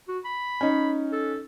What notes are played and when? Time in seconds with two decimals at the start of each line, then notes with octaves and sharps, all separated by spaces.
0.08 F#4
0.25 B5
0.61 C#4 D#4
1.12 A4